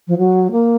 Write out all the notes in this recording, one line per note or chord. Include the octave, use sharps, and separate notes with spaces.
F3
F#3
A#3